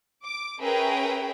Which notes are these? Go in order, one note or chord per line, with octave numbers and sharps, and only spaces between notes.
D6
C#4 G#4 A#4 B4 E5 G5